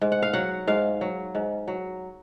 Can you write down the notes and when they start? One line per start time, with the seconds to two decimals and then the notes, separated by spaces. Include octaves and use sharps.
0.01 G#2
0.12 F#5
0.22 F5
0.33 F#3 F#5
0.67 G#2 F5
1.01 F#3
1.35 G#2
1.68 F#3